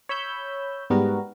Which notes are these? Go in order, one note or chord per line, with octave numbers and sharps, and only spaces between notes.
C#5 B5 E6 G6
G#2 G3 B3 F#4 A#4